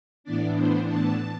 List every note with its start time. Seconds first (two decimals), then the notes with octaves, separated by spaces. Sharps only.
0.24 A2 E3 B3 D4 D5
0.56 C5
0.88 A5